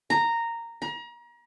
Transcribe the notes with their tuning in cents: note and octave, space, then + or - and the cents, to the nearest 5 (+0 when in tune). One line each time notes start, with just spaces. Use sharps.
A#5 -10
A#5 +35